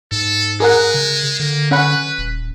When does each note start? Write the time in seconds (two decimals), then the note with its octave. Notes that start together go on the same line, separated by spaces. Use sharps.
0.12 G#2 A4
0.60 G#3 G#4 A#4 F#5
0.94 C#3
1.40 D3 A#3
1.71 C#4 B4 F#5 B5
2.19 D#1